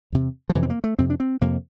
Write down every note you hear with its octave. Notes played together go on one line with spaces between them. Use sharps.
E2 C3
F3
F2 C3 E3
C4
A#3
A3
F2 C3 C4
D4
C4
F2 C3 A#3